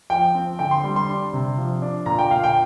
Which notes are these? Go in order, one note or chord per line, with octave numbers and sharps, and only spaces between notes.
F3 G5
C4
D3 G5
C6
G3
C6
D4
C3
F3
D4
A#2 A#5
G5
A#2 F5
G5